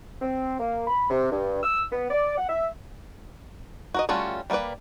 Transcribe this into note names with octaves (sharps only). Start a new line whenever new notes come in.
C4
A#3
B5
C3
G2
E6
B3
D5
F#5
E5
F#4 A#4 D#5
G3 A3 C#4 F4 F#4
G3 A#3 C#4 B4 D5